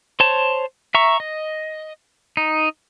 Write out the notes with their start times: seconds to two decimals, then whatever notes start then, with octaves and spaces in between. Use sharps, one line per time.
0.20 C5 C#5 A5
0.95 E5 A#5 C#6
1.20 D#5
2.37 D#4